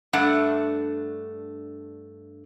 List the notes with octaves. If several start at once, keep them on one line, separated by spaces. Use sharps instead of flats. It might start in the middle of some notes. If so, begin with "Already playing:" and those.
G2 A3 D4 F#5